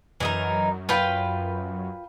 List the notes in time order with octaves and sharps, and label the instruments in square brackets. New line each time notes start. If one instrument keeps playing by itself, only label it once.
[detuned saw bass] F#2 [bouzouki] E3 D#4 A#4
[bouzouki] F4 B4 G5